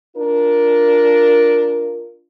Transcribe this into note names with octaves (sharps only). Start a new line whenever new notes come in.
D4 F4 A#4